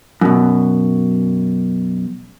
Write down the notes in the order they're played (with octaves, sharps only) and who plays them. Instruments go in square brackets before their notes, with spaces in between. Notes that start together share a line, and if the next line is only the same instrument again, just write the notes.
[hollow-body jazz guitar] F#2 B2